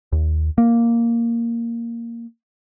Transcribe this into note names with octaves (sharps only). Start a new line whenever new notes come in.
D#2
A#3